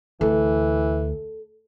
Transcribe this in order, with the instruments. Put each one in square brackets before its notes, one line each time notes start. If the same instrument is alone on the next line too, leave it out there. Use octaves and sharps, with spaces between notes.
[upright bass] D2 [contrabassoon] E3 [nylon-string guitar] A4